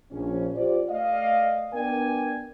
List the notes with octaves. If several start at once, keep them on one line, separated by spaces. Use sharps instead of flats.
A#1 C#4
F4 G4 C5 D5
A3 D5 D#5 F5
B3 D4 A#4 D5 G5 G#5